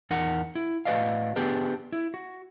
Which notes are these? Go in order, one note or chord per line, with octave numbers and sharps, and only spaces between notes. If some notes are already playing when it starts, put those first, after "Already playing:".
E2 D#4 A#4 F#5
E4
A2 F#4 B4 D5 D#5 F5
B3 D4 G4 G#4 B4
E4
F#4